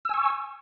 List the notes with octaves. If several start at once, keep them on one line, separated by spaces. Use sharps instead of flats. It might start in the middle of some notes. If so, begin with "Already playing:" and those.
G#5 C#6 E6